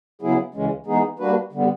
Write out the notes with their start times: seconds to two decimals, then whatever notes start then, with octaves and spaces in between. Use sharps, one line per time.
0.22 C#3 F#3 B3 E4 G#4
0.55 D2 C#3 E3 G#3 C#4
0.86 E3 G#3 B3 D#4 G#4
1.19 G3 A#3 D4 F#4 B4
1.53 D3 G3 B3